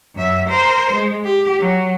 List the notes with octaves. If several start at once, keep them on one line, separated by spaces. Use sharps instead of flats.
F#2 E5
A#4 C5
G#3
G4
F#3